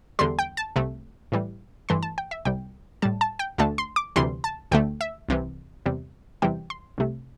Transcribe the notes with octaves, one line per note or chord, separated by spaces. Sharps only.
E2 D3 G3 C6
G5
A5
C2 C3 A3
A2 E3 G3
G2 E3 A3 C6
A5
G5
E5
C2 C3 G3 G5
A2 G3 A5
A5
G5
D2 D3 A3 A5
C6
D6
D2 C3 E3 G3 C6
A5
D2 D3 A3 G5
E5
C2 C3 E3
E2 C3 G3
E2 C3 E3 G3 G5
C6
C2 C3 A3